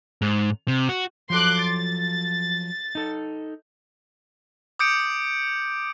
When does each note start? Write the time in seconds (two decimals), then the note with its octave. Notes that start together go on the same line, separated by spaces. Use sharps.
0.22 G#2
0.68 C3
0.89 F#4
1.30 F3 F#3 A4 C6 D6 F#6
1.63 A6
2.95 D#4 A4
4.79 D6 D#6 G6 C#7 D7